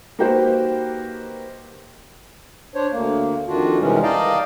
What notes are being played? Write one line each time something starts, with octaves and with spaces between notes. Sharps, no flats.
A#3 D#4 F#4 G4 B4 C5
D4 C5 C#5
D2 A#3
F2 D#3 D4 F4 F#4
C3 D#3 E3 G3 G#3 C#4
D5 D#5 F5 G5 A5 A#5